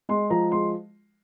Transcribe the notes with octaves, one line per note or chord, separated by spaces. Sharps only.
G#3 C6
F3 A#5
G#3 C6